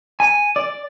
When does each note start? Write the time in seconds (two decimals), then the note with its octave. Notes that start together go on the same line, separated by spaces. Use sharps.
0.20 G#5
0.56 D5